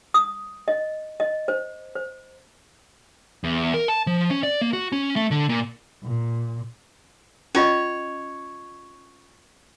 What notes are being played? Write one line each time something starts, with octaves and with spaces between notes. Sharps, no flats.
D#6
D#5
D#5
C5
C5
E2
A#4
A5
F3
C#4
D5
A#3
F#4
C#4
A3
D3
A#2
A#2
C#4 F4 C#5 D#5